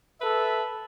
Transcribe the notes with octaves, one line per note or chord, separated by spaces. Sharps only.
A4 B4 E5